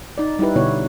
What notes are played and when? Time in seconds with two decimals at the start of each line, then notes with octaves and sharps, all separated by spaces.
0.18 D#4 D5
0.39 G3 D#4 E4 G4 B4
0.56 B2 D3 B3 E4 C#5